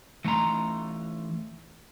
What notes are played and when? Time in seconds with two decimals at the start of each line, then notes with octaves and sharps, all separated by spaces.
0.25 E3 A3 D#4 A#5 C6